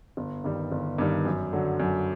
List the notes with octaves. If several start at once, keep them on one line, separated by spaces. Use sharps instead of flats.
G1
G2 D#3 G3
G1
G2 D#3 G3
F#2
D3 F#3
F#2